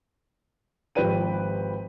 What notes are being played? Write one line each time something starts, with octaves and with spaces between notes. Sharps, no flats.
G#1 F3 G4 B4 G5 D#7